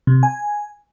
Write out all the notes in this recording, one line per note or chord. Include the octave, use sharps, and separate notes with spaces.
C3
G#5